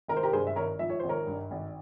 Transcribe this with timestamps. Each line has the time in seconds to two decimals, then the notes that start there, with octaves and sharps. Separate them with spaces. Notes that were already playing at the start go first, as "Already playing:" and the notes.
0.08 G#1 A#4
0.16 C5
0.23 G4 A#4
0.33 G2 G#4 C5
0.47 E5
0.56 G#1 A#4 C#5
0.79 F3 E5
0.90 C#5
1.00 G#1 C5
1.09 A#4 C#5
1.27 G2
1.51 G#1